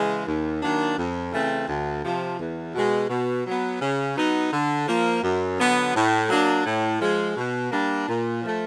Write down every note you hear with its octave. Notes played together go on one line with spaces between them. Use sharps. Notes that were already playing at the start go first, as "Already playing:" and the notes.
Already playing: C#3 E3 G#3
D#2
D#3 F#3 A#3 D4
F2
C#3 E3 A3 C4
D2
C3 F3
E2
B2 G#3
B2
F#3 B3
C#3
F#3 B3 D#4
D3
F3 A#3
F#2
D3 F#3 B3
A2
F#3 A#3 D4
A2
F3 G#3
B2
G3 A#3 D4
A#2
F3 A3